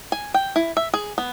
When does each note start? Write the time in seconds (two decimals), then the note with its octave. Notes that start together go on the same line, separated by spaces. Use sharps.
0.12 G#5
0.34 G5
0.56 E4
0.77 E5
0.94 G#4
1.18 B3